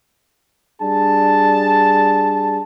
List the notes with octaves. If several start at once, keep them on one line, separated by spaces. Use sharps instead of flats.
G3 D4 G#4 A5